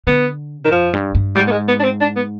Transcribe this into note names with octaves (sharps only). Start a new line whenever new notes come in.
D3 B3
D#3
F2 F3
G2
G2
G#2 G3
B3
G#3
B3
D4
C4
D4
B3